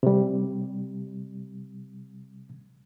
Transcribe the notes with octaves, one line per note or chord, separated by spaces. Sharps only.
C3 G3